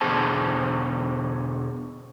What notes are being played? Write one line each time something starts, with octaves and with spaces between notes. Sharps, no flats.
E2 B2 D3 G#4 C5 A5